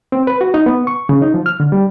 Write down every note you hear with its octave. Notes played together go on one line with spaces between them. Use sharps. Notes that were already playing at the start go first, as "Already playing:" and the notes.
C4
B4
F#4
D#4
B3
C#6
C#3
D#4
F3
F6
D3
G3